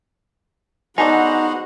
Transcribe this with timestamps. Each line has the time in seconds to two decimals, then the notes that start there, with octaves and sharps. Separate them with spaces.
0.98 B3 D#4 F#4 G#4 A4 C5 D5 F#5